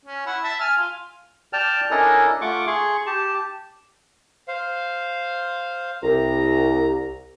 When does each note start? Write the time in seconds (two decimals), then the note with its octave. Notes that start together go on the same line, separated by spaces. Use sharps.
0.06 C#4
0.26 E4 F#5
0.43 E5 A5
0.60 G#5 F6
0.77 F4
1.53 D5 G5 A5 F6
1.91 C#4 D4 E4 A4 A#4 D#5
2.41 A3 F4 F#5 C#6 D6
2.67 G#4 C6 C#6
3.07 G4 A5
4.48 C5 F5
6.03 C2 A#5